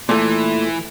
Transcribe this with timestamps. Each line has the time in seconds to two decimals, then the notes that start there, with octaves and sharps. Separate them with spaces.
0.09 A#2 E3 A3